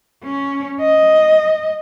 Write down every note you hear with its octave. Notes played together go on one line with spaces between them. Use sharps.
C#4
D#5